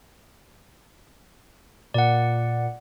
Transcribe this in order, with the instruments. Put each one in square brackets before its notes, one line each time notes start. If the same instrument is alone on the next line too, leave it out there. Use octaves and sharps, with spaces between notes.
[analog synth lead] A#2 [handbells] D5 F#5